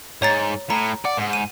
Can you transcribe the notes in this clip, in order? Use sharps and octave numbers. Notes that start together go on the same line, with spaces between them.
G#2 C#5 A#5 A6
A2 A#5
D5 F#5
G#2
D#7